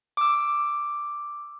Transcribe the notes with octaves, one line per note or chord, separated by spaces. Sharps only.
D6 E6